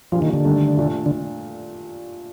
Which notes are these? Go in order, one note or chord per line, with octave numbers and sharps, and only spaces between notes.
A#2 F3 G3 A#3 D4 G4
D#3
D3
G2 D#3 A3 D4 G4
A#2 A3 D4
D3